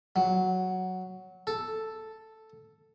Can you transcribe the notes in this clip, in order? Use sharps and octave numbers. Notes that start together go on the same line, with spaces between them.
F#3
A4